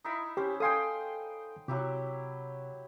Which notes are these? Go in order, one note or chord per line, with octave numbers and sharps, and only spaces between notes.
D#4 E4 B5
C#4 G4 C5
A4 F5 G5 G#5 C6 D#6
C3 F#3 E4 G4